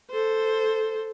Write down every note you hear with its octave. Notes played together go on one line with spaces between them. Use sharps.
A4 C5